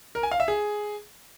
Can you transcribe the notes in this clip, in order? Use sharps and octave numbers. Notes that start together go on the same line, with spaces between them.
A#4
G#5
F5
E5
G#4